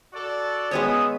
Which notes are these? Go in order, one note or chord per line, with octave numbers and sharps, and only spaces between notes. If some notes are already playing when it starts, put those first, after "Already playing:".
F#4 A4 D5
G#3 B3 C#4 C#5 E5 D#6